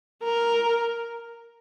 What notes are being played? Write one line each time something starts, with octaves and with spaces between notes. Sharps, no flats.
A#4